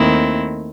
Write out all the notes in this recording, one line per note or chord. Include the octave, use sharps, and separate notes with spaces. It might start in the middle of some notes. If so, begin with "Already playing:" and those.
Already playing: D#2 D#3 A3 C4 E4